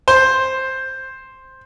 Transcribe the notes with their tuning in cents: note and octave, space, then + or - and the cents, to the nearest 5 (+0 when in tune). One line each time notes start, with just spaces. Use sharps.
C5 +5